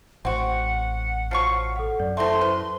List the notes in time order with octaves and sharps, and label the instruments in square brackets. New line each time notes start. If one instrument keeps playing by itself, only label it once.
[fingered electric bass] A1 [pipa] C4 F#4 [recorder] F#5
[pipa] F3 F#3 C#6 [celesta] F6 C7 C#7
[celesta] A4 F#5
[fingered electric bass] F#2 [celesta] D5
[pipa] A3 C4 [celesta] E4 A4 E5 [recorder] C6
[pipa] B4 [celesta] C5